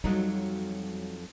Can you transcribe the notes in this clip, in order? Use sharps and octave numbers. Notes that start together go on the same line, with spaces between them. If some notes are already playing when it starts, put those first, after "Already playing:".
F2 F#3 G3 D#4